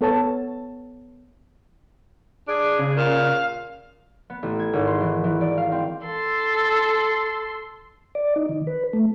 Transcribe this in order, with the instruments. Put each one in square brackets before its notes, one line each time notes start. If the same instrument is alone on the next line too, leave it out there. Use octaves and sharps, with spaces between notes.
[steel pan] B3 A4 C#5 A5
[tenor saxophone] D4 [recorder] G#4
[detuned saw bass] C#3
[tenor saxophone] A#2 [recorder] F5
[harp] B3
A1
G#6
G#1
C6
E3
E3
D5
F5
C4
[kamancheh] A4 C6
[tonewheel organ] D5
D#4
D#3
B4
A3